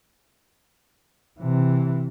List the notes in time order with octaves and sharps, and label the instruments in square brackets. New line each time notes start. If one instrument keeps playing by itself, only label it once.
[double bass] C3 E3